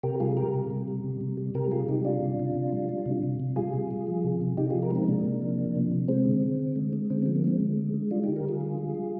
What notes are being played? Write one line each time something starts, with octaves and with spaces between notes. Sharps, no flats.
C3 G4 A#4
G3 F4 G#4
G3 G4 A#4
C3
C3
G3
C3
C3
G3
C3 G4 A#4
G3 F4 G#4
C3 D#4 G4
G3 D4 F4
C3
C3
C3
G3
G3
C3
C3
C3
G3 F4 G#4
C3
G3
F3
C3
C3
C3 D#4 G4
F4 G#4
F3
G4 A#4
G#3 C4 D#4
C3 A#3 D4
C3
F3
F3
C3
C3
G#3 C4
D3
D3
D3
G#3
G#3
D3 C4
F3 C4
A#3
G#3 C4
D3
G#3
G#3
G3 D4 F4
D#4 G4
D3
G4 A#4
D3 F4 G#4
G3
G3
G3